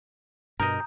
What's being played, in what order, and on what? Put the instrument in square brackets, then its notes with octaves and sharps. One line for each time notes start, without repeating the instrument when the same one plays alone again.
[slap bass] G2 B2 [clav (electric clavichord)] A#4 D#5 [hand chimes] A#5 D#6 G6